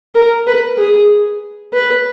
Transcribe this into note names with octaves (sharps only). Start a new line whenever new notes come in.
A#4
B4
G#4
B4